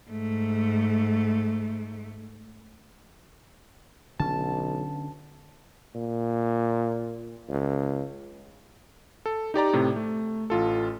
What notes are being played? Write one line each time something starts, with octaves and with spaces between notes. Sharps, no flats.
G#2 A3
B1 D3 C#4 A5
A#2
C#2
A4
D#4 G4 D5 A#5
A2 C3
A3
A1 F4 A4